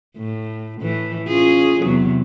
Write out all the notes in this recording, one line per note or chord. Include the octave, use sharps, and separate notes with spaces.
A2
A2 E3
C#4 F4 G#4
E2 C3 F#3